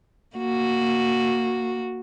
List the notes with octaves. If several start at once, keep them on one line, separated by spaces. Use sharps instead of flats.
A#3 F#4